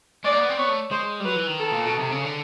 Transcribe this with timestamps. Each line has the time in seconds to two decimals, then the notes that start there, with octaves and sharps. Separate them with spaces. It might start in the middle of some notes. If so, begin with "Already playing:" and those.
0.24 G#3 D5
0.33 A#3
0.41 B3
0.49 C4
0.57 B3 C#5
0.69 A3
0.91 G#3 C5
1.20 G3
1.25 F#3 B4
1.36 E3
1.47 D#3
1.58 A4
1.72 A#2
1.86 B2
1.99 C3
2.12 C#3
2.25 D3